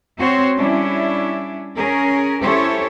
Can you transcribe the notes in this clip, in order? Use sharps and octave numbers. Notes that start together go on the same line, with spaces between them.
C4 F#4 C5 C#5
G3 C#4 D4 E4
C#4 G#4 A#4
C#4 E4 G4 A4 C5 C#5